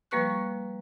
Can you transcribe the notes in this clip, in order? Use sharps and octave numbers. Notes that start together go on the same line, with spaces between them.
F3 G3 A#3 B4 C#6 F#6